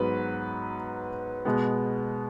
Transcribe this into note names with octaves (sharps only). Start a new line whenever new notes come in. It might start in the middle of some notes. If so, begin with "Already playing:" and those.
Already playing: G#2 F#3 B3 B4
B2 G#3 B3